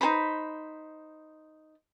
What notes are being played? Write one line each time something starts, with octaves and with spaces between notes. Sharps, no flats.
D#4 G#4 C5 B5